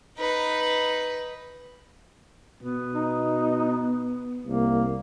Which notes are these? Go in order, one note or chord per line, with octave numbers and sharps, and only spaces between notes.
D#4 B4
B2 B3
D#4
C2 A#3